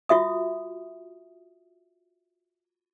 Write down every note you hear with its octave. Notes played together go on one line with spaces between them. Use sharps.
F4 F#4 E5 D#6